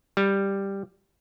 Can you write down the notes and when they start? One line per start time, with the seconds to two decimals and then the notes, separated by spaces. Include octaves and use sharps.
0.17 G3